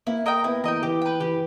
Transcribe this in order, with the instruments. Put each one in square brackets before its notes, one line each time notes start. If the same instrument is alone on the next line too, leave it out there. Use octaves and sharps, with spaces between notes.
[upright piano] A#3 [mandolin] E4
[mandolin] A#4 D#5 G5
[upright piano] B3 [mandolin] E4
[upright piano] E3 [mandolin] A#4 D#5 G5
[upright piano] E3 [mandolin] G4
[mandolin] B4 G5
[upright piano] E3 [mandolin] G4